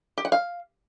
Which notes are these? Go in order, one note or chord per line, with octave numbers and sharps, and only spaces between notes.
G4
F#5
F5